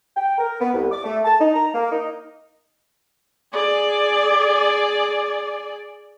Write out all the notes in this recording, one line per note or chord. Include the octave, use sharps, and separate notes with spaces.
G5
A#4
B3
C2
D6
A3
A5
D#4
A#5
A#3
D#4
G#4 D5